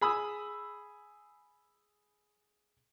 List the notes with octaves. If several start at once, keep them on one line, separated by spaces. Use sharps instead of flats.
G#4 B5 D#6 E6